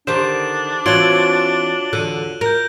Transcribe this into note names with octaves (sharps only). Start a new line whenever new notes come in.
D3 D#3 D4 G4 C5 E7
E3 C4 F4 F#4 C#5 D7 F#7 G7
E2 D3 A4 F#6 D#7
A#4 G6 A#6